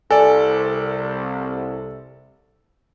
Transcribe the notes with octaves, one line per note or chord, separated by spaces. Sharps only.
C2 A4 D5 G#5